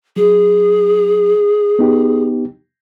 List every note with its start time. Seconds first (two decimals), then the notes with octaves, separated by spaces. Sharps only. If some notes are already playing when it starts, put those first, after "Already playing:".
0.16 F#3 G#4
1.79 B3 D#4 G4